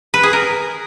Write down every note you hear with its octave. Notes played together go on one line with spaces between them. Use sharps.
B4
G#4
A#4